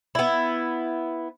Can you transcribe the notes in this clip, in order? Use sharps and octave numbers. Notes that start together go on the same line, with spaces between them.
B3 E4